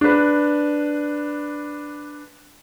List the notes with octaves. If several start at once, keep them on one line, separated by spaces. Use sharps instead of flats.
D4 B4